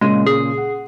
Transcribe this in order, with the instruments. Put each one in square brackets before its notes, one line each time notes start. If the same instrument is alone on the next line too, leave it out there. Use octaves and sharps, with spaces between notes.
[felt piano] A#2 C#3 D#7 [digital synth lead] G#3
[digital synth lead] G#4
[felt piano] F#5